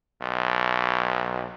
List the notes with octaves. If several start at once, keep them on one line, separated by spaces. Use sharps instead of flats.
B1